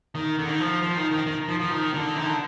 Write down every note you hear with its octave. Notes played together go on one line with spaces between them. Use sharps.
D#3
D3
D#3
F3
F3
D#3
D#3
D#3
F3
F3
D#3
D3
D#3
D3